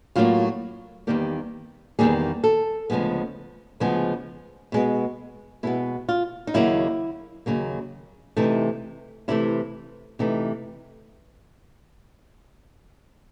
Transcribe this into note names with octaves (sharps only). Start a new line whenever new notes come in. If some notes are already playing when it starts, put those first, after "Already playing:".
A2 F#3 A#3 F4
E2 C3 D#3 G3 A#3 G4
E2 C3 D#3 G3 A#3 G#4
A4
D2 C#3 F3 G#3 B3
D2 C#3 F3 G#3 B3 G#4
B2 G#3 B3
B2 G#3 B3 E4
F4
D#4
D#2 C#3 F#3 A#3 E4
D#2 C#3 F#3 A#3
C3 E3 A3 D#4
C3 E3 A3 E4
C3 E3 A3 D#4